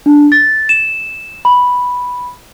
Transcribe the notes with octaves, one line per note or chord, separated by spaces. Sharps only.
D4
A6
E7
B5